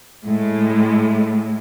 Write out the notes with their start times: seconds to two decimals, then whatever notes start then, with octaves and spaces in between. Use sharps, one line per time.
0.25 A2 G#3